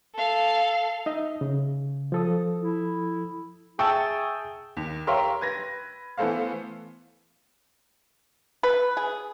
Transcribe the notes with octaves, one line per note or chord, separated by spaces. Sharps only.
A4 F5
D#4 D#5 E5
C#3
F3 A4 D#6
E4
G#4 E5 G5 A5 C#6 E6
D#2
G4 A#4 C#5 E5 F5 C6
B4 G#6 A#6
E3 A3 B3 A4 C5 F5
B4
G#4